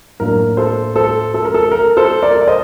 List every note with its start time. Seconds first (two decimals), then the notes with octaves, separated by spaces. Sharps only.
0.20 A2 F#3 A#3 D4 A#4
0.57 A4 C5
0.96 A4 C5
1.34 A4
1.45 A#4
1.54 A4
1.72 A#4
1.97 A4 C5
2.23 A#4 D5
2.41 D5
2.48 C5 D#5